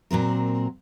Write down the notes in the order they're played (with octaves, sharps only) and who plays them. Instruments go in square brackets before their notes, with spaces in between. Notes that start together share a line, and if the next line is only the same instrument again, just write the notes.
[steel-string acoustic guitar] A#2 F#3 C4 A#4